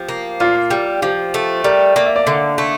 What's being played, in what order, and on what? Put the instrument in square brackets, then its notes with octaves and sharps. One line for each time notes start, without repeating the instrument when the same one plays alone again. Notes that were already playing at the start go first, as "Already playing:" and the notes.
Already playing: [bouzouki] F3 [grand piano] G4
[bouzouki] A#3
[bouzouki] A#2 [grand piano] F4
[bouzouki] G3
[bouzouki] F3 [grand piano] G4
[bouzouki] A3
[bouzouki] G3 [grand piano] A#4
[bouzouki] A#3 [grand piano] D5
[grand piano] E5
D5
[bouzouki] D3 [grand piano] E5
[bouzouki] A3